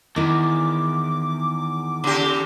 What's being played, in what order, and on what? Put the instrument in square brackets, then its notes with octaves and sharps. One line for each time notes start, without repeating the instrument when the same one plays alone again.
[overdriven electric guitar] E2 [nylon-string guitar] D#3 E4 [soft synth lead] D6
[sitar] C#3 G4